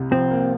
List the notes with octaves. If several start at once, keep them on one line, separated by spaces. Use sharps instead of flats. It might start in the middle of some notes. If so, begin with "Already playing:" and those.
Already playing: C2 C3
F3 C4
A#3